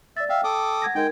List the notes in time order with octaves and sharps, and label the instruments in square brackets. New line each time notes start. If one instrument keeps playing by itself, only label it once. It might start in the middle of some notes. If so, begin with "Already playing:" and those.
[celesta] D5 A6 [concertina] E5
[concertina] E5 F5 [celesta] G5
[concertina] A4 D6 D#6
[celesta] F#5 G#6 A#6
[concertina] G#3 G5 [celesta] D#4 A#4 G#6